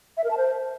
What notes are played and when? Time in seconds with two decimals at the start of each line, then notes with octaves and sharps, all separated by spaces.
0.17 E5
0.24 A#4
0.31 A5
0.37 C5